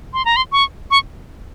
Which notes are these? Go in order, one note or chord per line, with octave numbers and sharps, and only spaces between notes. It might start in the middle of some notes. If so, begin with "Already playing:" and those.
C6
A#5
C6
C#6
C#6